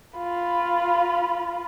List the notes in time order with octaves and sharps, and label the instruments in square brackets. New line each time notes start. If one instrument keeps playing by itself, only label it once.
[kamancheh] F4 B5